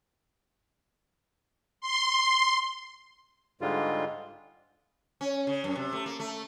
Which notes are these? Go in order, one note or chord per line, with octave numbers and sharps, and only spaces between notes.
C6
G#2 D3 G3 G#3 F4
C#4
C#3
F#2
C3
A3
A#3
A3